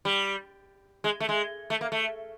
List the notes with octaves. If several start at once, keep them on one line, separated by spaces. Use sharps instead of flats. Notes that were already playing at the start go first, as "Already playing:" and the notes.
G3
G#3
A3
G#3
A3
A#3
A3